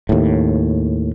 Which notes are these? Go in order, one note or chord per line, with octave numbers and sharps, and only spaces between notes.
D#2 A2